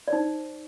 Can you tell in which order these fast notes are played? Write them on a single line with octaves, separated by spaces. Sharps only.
D5 C5 D#4